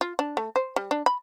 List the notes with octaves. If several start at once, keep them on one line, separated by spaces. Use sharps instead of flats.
F4
D4
A3
C5
G3
D4
B5